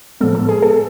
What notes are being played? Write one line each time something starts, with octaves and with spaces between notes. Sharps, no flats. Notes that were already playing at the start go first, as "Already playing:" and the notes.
A2 F3 G#3 B3 A4
A4
G#4
A4